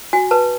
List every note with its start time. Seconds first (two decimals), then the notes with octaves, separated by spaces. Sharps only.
0.13 F#4 G#5
0.31 B4 A5